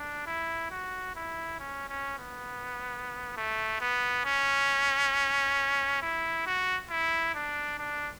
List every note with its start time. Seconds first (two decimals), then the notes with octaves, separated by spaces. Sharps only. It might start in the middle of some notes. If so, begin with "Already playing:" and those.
Already playing: D4
0.27 E4
0.71 F#4
1.16 E4
1.59 C#4
1.89 C#4
2.18 B3
3.37 A3
3.81 B3
4.25 C#4
6.02 E4
6.46 F#4
6.90 E4
7.35 D4
7.79 D4